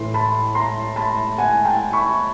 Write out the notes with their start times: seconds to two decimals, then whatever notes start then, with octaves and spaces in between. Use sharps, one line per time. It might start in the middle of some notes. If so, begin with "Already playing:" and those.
Already playing: A2 E3 C6
0.14 A5 B5
0.55 A#5 C6
0.96 A5 B5
1.38 F#5 G#5
1.65 G5 A5
1.93 B5 C#6